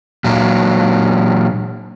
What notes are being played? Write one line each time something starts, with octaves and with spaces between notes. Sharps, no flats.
A#2 F#3